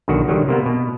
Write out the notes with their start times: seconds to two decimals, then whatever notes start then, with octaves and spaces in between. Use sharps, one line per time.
0.08 B1 D3 D#3 F#4
0.28 D3 D#3 F#3 G3
0.48 C3 A#3 B3
0.66 B2